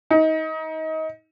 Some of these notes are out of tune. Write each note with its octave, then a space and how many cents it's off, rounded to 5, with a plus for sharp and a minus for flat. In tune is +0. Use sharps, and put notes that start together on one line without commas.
D#4 +25